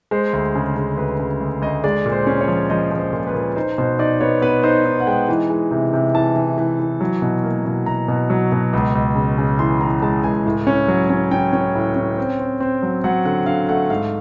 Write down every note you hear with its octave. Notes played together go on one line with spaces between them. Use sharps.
G#3 C5
D2
C#3
C#3
D2 B4
C#3
D2
D2 D#5
G#3 D5
A#2
C5
C#4
C#5
F3
F3 D#5
F3
C5
A#2
B4
A#2
D#4 C5
B2 C5
D#4 D5
B3 C#5
B3 B4
D#4 C5
D#4
F#5
G#3 G5
E3
G#3
C3
C3
E3 A5
E3
E3
E3
F#3
B2
A#3
B2
B2 A#5
B2
F#3
B2
C#2
C#2
C#3
C#3
E3 C6
E3 A#5
G#3 A5
C#2 G#5
A2
C#4
F#3
C#4
C#4 G5
C#4
A2
C#4
C4
C4
C4
F#3
F#3 F#5
D3 F#5
D3 F5
A3 F#5
G#2 F5